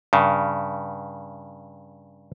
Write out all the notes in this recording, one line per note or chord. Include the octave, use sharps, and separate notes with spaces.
G2 C#3